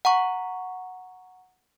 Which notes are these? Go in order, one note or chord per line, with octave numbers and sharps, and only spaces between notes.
F#5 A#5 C#6